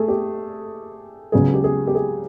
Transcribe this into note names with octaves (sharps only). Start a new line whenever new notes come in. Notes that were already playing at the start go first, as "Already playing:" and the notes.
Already playing: A3 G#4 A4
G4
C#2 C#3 F#3 B3 G#4
G4
G#4
G4
G#4